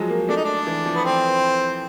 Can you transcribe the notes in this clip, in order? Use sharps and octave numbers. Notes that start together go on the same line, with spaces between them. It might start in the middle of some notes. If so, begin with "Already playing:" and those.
Already playing: F3 F#3 G#3
A#3
A3 D4
D#4
D4
E3
F3
B3
C4